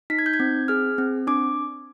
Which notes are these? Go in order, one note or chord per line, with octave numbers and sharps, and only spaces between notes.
D#4 B6
G#6
G6
G#6
C4
G#4 F6
C4
D4 D6